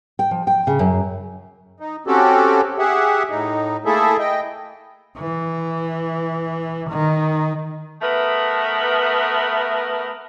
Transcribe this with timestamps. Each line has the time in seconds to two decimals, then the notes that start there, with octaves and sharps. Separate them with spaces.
0.19 G5
0.31 F3
0.47 G5
0.67 C#3
0.79 F#2
1.80 D#4
2.07 C4 C#4 F#4 G4 A4
2.79 G4 G#4 E5 F#5
3.30 A2 D#4
3.85 A3 A#3 E4 G#4 A4 E5
4.19 D#5 G5
5.17 E3
6.90 D#3
8.02 A3 B3 A#4 B4 E5